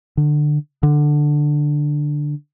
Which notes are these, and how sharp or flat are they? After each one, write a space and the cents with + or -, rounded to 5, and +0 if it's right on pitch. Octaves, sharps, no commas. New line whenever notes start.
D3 +20
D3 +10